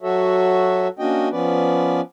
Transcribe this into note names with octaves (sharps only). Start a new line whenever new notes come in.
F#3 F#4 A4 C#5 E5
A#3 C#4 D4 F#4 D#5 G5
F3 B3 C#4 B4 D5